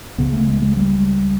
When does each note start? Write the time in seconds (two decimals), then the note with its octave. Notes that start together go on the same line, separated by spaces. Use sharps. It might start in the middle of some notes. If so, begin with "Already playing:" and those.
0.18 C#2 C#3 B3
0.33 A3
0.48 G#3
0.62 G#3
0.77 G3